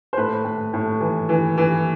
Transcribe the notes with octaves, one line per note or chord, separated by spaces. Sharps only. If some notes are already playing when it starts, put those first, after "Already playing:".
C5
A2 B4
A2
A2
E3
E3
E3